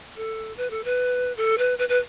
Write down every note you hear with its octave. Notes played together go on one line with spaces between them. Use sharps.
A4
B4
A4
B4
A4
B4
B4
B4